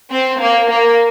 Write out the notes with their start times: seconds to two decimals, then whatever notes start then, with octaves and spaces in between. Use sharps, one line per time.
0.11 C4
0.40 A#3
0.70 A#3